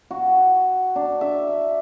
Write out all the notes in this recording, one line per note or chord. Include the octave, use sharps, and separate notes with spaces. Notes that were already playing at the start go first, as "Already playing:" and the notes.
F#4
D4
E5